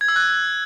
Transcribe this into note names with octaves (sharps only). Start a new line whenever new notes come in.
G#6
E6
F#6